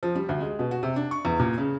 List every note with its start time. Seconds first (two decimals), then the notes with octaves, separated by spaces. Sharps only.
0.03 F3
0.15 G3
0.29 D2
0.40 G#3
0.59 B2
0.71 F#4
0.83 C3
0.96 D4
1.11 C#6
1.25 E2
1.39 A#2
1.58 C#3